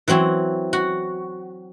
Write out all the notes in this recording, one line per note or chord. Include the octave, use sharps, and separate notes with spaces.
E3 F#3 C4 F#4
F#4